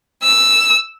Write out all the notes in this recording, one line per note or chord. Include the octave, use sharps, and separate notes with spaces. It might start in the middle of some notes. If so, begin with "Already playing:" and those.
E6